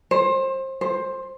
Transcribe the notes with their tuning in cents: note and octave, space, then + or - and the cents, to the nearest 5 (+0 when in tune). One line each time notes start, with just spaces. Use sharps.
C5 +25
C5 +15